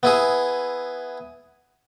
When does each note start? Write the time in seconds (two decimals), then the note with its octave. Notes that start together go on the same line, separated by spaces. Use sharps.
0.03 B3 E4 G#4